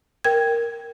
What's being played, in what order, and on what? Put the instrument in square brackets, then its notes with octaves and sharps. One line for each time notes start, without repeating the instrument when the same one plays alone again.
[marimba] A#4 G5 G#6